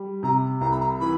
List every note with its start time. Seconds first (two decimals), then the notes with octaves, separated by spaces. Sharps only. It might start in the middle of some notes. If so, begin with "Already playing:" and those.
Already playing: G3
0.23 C3 A#5
0.61 C2 A#5
0.71 B5
0.80 A#5
1.00 E3 B5